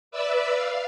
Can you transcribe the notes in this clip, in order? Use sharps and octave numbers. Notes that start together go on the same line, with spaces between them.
B4 D5 E5 E6
F5